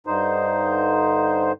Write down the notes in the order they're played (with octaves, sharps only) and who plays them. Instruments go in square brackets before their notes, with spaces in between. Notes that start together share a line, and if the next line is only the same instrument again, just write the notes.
[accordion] G2 D3 D#4 C5